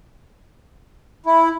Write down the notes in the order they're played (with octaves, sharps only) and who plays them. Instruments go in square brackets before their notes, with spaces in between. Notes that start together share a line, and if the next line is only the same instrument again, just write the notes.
[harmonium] E4